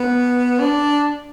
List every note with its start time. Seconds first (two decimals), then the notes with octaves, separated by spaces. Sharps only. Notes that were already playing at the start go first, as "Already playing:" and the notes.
Already playing: B3
0.59 D4